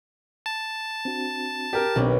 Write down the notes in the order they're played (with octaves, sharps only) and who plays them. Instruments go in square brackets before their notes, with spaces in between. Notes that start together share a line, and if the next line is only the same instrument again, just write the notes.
[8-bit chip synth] A5
[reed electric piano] C4 D4 F#4
[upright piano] G4 A#4
[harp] B1 [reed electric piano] C4 D4 C#5